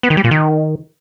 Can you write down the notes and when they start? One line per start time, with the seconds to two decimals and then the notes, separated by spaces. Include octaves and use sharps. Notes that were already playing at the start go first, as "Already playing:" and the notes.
0.03 B3
0.10 D#3
0.17 G3
0.24 A#2
0.31 D#3